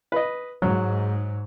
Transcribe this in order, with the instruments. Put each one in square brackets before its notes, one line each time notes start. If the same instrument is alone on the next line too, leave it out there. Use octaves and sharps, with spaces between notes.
[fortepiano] B4 D#5
[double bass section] G#2 [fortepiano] F#3